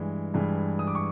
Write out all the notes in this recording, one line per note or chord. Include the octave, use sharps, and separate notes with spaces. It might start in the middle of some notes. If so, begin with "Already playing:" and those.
Already playing: G2 E3 G#3
G2 E3 G#3
D#6
D6
C#6